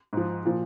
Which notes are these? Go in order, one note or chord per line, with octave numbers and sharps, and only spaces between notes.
G#2 F3
A#2 F3